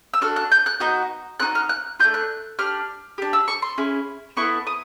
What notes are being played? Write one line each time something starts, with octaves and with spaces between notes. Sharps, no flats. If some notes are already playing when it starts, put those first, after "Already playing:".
E6
D4 F#4 A4 F6
F#6
G6
F#6
B3 D#4 F#4 G6
C4 D#4 F#4 F#6
F6
F#6
A3 D4 F4 G6
F#6
D4 G4 F6
D4 G4
E6
C#6
C6
C#4 E4 G#4
B3 E4 A4 C#6
D#6